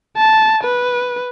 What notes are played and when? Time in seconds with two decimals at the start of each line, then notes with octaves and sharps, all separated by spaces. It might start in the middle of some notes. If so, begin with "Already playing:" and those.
0.17 A5
0.64 B4